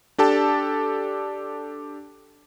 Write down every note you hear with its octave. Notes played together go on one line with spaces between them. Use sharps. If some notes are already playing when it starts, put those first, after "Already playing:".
D4 G4 A4 A5